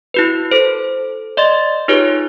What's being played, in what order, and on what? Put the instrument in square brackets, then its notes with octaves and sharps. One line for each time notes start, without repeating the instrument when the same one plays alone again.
[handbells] E4 F#4 B4
A4 C5
D5 D#5 C6 A6
D#4 F4 G4 G#4 B4 C#5